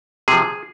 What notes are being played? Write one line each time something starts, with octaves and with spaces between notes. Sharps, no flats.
C3 F3 G#4